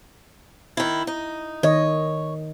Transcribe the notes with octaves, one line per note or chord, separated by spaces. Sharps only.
D#3 E4
D#4
D#3 C#5 D#5